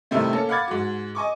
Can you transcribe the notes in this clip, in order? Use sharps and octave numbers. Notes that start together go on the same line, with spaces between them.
A2 C3 D#3 G3 A3
A#3 C#4 A4
F5 F#5 B5 D6 G#6 A6
G#2 F#4
D#5 G#5 C#6 D6